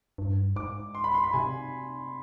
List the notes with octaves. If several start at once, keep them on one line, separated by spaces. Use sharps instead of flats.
G2
G#2 D6
C6
B5
C6
B5
C3 G#5